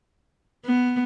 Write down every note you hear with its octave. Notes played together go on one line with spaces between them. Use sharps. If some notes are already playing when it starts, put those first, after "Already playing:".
B3